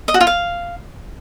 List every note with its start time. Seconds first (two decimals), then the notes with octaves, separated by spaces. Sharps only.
0.08 D#5
0.14 F#4
0.21 F4
0.27 F5